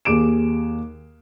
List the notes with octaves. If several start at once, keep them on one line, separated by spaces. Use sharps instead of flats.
D#2 G#4 D6 D7 E7